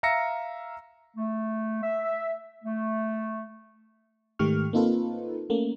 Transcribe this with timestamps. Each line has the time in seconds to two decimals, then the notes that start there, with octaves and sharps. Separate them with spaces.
0.03 E5 F5 A#5 E6 A#6 C#7
1.16 A3
1.82 E5
2.63 A3
4.39 G#2 D#3 A3 G4 C#6 F6
4.73 A#3 C4 D#4 F4 A4 B4
5.50 A3 A#3 C#4